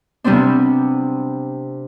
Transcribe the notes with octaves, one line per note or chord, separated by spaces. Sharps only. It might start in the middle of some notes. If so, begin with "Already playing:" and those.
C3 G3 B3 C4 D4